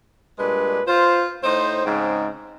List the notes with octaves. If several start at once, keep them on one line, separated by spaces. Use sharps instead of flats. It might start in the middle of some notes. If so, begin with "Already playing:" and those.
G2 A#2 G#3 D4 B4
F4 C5
A2 D#4 C5
G#2 C#3 C4 D#4